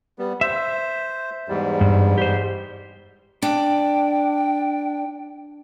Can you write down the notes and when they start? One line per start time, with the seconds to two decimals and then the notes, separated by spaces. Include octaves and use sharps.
0.19 G3 B3
0.41 C5 E5
1.48 E2 G#2 G3
1.81 G2
2.18 G4 C5
3.42 D4 G5